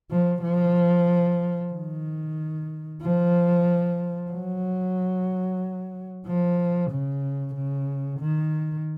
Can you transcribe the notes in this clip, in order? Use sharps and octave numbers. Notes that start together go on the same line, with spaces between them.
F3
F3
D#3
F3
F#3
F3
C#3
C#3
D#3